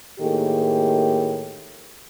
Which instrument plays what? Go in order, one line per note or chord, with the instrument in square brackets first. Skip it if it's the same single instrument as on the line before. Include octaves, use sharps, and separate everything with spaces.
[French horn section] A2 D#3 A3 A#3 G4 G#4